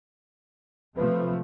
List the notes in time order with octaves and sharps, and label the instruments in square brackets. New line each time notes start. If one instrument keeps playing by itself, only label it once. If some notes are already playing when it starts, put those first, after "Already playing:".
[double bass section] C3 F3 A3 [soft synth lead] B4